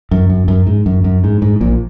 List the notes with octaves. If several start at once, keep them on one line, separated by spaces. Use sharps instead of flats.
F#2
F#2
F#2
G#2
F#2
F#2
G#2
G#2
A#1 A#2